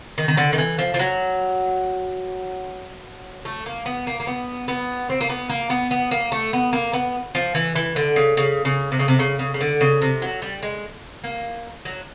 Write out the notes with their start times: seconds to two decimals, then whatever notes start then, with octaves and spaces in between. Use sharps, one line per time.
0.18 D#3
0.28 D#3
0.37 D3
0.53 D#3
0.58 E3
0.79 F3
0.94 F3
0.99 F#3
3.45 A3
3.66 A#3
3.86 B3
4.07 A#3
4.20 A#3
4.27 B3
4.68 B3
5.10 C4
5.21 A#3
5.30 B3
5.50 A#3
5.70 B3
5.91 B3
6.11 A#3
6.32 A3
6.53 B3
6.73 A#3
6.93 B3
7.35 F3
7.55 E3
7.76 E3
7.96 D3
8.16 C#3
8.37 C#3
8.65 C#3
8.92 C3
8.99 C#3
9.08 C3
9.19 C#3
9.39 C#3
9.54 C#3
9.61 D3
9.81 C#3
10.02 C3
10.22 F#3
10.42 G3
10.63 G#3
11.24 A#3
11.85 F#3